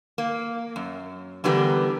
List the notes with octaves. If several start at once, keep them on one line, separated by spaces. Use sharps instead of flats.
A#3
F#2
D3 E3 G3 B3 G4 A#4